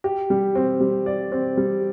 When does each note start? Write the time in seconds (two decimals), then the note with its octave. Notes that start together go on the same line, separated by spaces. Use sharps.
0.04 G4
0.30 G3
0.55 C4
0.80 G3
1.06 D5
1.32 C4
1.57 G3